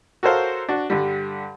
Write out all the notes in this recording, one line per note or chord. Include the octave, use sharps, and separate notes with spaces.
F#4 A4 A#4 C5 C#5 F5
D4 F#4
G2 D3 G3